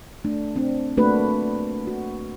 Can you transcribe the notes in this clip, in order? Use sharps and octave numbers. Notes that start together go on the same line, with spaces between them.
A3 D4
C4 D4
A3 A#3 D4 F#4 B4
F#4